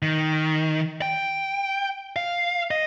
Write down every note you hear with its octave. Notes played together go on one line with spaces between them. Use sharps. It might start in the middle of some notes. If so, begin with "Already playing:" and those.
D#3
G5
F5
D#5